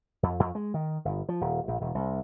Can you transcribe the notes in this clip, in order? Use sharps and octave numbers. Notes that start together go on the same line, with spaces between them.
F2
F2
G#3
D#3
G1
F3
D#1
A#1
E1
C2